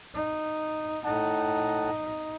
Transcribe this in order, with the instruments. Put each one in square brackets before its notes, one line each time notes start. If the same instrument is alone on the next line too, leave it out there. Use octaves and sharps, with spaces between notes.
[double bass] D#4
[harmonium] A2 F#5 A5 [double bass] D#4